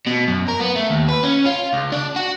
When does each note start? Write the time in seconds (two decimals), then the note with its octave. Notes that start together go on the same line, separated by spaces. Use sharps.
0.07 B2
0.28 F#2
0.48 A#4
0.60 B3
0.76 A3
0.90 D#2
1.09 B4
1.24 C#4
1.46 F4
1.73 C#2
1.92 D4
2.16 F#4